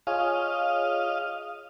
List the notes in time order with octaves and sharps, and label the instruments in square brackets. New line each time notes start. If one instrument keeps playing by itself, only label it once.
[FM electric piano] F4 G#4 C#5 [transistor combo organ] D#5 F5